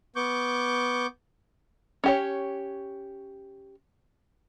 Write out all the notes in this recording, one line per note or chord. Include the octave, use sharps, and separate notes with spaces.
B3 C#6 D6 G6
C#4 G4 C#5